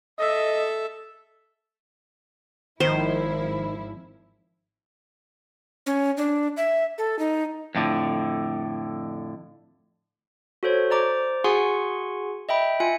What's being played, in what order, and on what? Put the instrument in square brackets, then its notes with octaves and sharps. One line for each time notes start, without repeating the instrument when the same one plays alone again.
[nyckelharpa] A4 E5 [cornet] D#5
[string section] G#1 F3 E4 [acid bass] D#3 [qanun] C5
[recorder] C#4
D4
E5
A4
D#4
[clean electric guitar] F2 A2 D3
[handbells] F#4 A4 C5 C#5
C5 D5 A#5 D6
F#4 G#4 F#5 G#5 C6 C#6
D#5 E5 G5 B5
F4 E5 G#5 C#7